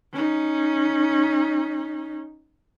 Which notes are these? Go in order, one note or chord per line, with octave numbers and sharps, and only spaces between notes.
C#4 D#4